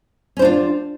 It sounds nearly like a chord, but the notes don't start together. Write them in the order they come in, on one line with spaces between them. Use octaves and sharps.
C#4 C5 D4 F4